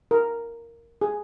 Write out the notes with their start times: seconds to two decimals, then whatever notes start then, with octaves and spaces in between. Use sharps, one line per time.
0.11 A#4
1.01 G#4